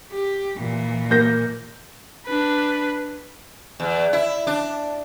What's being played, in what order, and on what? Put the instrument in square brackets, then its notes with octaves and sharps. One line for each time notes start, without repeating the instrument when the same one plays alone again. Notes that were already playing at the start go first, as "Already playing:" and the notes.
[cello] G4
A#2 E3
[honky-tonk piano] A#3 G6 A#6
[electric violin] D4 B4
[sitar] E2
E4
D4